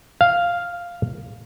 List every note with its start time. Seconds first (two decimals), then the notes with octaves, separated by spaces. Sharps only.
0.21 F5